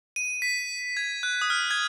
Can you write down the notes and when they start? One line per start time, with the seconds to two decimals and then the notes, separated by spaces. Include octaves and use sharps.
0.16 D#7
0.42 B6
0.97 G#6
1.23 F#6
1.42 D#6
1.50 F6
1.71 G#6